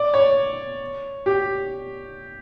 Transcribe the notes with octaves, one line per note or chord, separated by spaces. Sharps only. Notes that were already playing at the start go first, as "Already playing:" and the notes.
Already playing: D5
C#5
G4